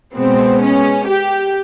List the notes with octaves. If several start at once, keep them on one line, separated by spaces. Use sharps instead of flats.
B2 G#3 B3 C4
C#4
G4